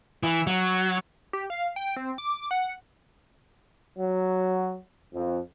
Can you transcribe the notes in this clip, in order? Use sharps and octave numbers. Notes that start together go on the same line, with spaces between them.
E3
F#3
G4
F5
G5
C4
D6
F#5
F#3
F2